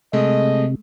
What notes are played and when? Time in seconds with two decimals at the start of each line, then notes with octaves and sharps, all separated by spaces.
0.13 C3 G#3 A3 D#5